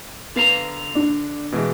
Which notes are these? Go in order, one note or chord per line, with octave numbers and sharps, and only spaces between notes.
D3 B3 F5 A#5
D4
B2 E3 G#3